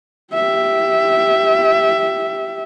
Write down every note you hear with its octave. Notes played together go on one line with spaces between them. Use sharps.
G4 E5